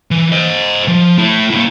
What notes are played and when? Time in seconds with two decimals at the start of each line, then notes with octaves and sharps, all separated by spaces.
0.11 E3
0.32 C5 D#5
0.88 F3
1.18 A3 E4
1.50 A#3 E4